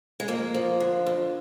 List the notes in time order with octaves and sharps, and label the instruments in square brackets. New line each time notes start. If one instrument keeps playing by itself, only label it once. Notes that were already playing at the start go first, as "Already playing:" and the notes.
[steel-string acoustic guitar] G#3
F2 A#3
F3
D3
F2